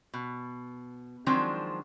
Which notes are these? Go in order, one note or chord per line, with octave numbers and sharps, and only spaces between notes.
B2
D#3 F3 F#3 G#3 C4 D4